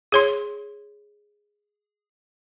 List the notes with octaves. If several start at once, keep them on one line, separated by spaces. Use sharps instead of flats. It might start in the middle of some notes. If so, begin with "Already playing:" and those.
G#4 C#5 C6